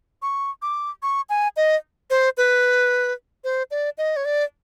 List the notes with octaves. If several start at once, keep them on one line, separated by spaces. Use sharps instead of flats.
C#6
D6
C#6
G#5
D#5
C5
B4
C5
D5
D#5
C#5
D5